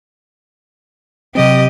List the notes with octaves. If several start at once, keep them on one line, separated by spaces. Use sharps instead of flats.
C3 F#3 C4 G4 D#5